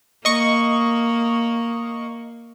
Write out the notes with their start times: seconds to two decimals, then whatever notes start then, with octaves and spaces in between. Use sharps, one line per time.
0.25 A#3 D#5 C#6